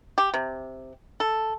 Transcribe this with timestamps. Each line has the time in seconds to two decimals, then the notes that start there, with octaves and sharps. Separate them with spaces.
0.18 G4
0.34 C3
1.20 A4